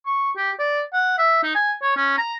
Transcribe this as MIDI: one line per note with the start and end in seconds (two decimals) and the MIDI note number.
0.06 0.31 85
0.36 0.51 67
0.59 0.81 74
0.93 1.16 78
1.18 1.40 76
1.43 1.54 63
1.55 1.73 80
1.82 1.96 73
1.97 2.16 61
2.18 2.35 82